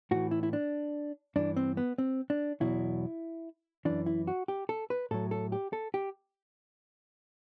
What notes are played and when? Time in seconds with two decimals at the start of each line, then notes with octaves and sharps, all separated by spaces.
0.11 A2 E3 F#4
0.31 E4
0.43 E4
0.53 D4
1.36 G2 E3 D4
1.57 C4
1.77 B3
1.98 C4
2.30 D4
2.60 E2 B2 F#3 E4
3.85 F#2 E3 D4
4.06 E4
4.27 F#4
4.48 G4
4.69 A4
4.90 B4
5.11 A2 F#3 A4
5.31 A4
5.52 G4
5.73 A4
5.94 G4